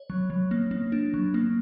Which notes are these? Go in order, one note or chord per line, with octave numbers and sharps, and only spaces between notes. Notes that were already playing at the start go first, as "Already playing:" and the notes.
Already playing: C#5
F#3
F#3
A#3
A#3
D4
F#3
A#3